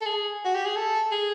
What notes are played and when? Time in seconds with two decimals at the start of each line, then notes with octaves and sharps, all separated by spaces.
0.01 A4
0.06 G#4
0.45 F#4
0.55 G4
0.66 G#4
0.76 A4
1.11 G#4